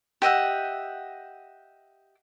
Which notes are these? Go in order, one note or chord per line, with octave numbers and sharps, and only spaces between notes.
G4 D#5 E5 F#5